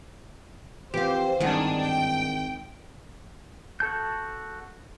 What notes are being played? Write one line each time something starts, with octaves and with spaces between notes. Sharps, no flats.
F2 E3 G4 C5 F5
G#1 G2 D#3 E3 D4 G#4 F#5
G5
F#4 A4 A5 G6